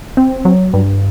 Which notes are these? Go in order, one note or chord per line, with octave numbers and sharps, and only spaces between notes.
C4
F#3
G2